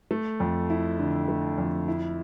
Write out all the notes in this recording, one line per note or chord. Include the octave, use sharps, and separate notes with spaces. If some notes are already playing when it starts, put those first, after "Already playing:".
A3
F2
E4
D3
A3
F2
E4